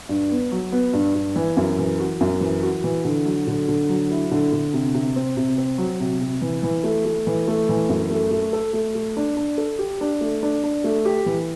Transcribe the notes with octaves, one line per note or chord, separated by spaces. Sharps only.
G2
B3
F#3
B3
G2
G2
E3
F#2
E3
F#4
F#2
E3
F#4
E3
D3
F#3
D3
D3
F#3
E4
D3
D3
C3
C3
C4
C3
C4
F#3
C3
C3
E3
E3
A3
A3
E3
A3
E3
F#2
A3
A3
A4
A3
A3
D4
D4
A4
G4
D4
A3
D4
D4
A3
G4
E3